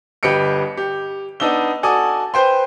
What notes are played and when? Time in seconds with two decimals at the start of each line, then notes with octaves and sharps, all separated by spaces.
0.23 G1 G4 B4 D#5 C#7 D7
0.77 G4
1.40 B3 D4 D#4 E6 G7
1.83 F#4 A4 D5 G#5 D#6
2.34 B4 C5 G5 C6